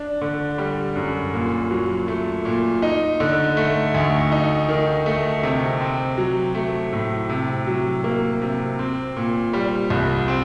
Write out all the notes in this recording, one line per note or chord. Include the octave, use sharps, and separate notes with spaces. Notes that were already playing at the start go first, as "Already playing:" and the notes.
Already playing: D4
D3
G3
F#2
A#2
F#3
A3
A#2
D#4
D3
A3
D2
D#4
D#3
A3
C3
C4
F#3
A3
A2
C3
F#3
A#3
C3
C4
A#2
G3
C2
C4